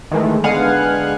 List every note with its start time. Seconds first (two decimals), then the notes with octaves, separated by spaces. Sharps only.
0.11 D#3 E3 G#3 A3
0.44 D3 G#3 B3 F5 F#5 G#5